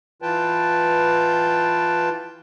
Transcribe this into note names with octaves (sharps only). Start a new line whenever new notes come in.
E3 F4 B4 G5 A5